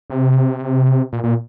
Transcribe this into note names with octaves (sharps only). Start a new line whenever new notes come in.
C3
A#2
A#2